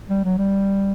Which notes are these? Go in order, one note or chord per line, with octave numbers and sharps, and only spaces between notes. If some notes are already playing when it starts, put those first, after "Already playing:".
G3
F#3
G3